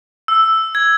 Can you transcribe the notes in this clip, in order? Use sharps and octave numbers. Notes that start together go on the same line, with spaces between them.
E6
G#6